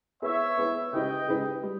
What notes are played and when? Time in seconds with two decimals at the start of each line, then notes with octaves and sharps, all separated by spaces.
0.22 B3 E4 G#4 B4 C#5 E5
0.57 B3 E4 G#4 B4
0.93 C#3 G#3 D#4 G4 B4 D#5 G5
1.28 C#3 G#3 D#4 G4 B4
1.63 G3